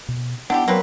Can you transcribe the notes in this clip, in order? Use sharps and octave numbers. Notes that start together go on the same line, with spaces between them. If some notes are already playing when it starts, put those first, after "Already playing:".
B2
B3 D4 E4 G4 F#5
F#3 A#3 C4 B4